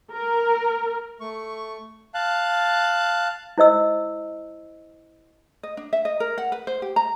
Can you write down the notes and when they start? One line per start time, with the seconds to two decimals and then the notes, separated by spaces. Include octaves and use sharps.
0.12 A#4
1.20 A3 C#6
2.14 F5 A5 F#6
3.58 E4 C5 D#5 E6
5.63 D#5
5.77 D4
5.93 E5
6.05 D#5
6.20 A#4
6.38 F#5
6.52 B4
6.67 C5
6.82 G4
6.96 A#5